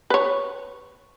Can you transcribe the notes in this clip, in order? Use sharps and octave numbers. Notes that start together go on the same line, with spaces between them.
B4 C#5